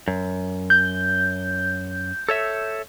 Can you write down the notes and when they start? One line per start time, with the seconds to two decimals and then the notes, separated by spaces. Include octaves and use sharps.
0.08 F#2
0.70 G6
2.29 A4 C#5 E5